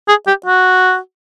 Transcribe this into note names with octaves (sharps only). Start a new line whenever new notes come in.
G#4
G4
F#4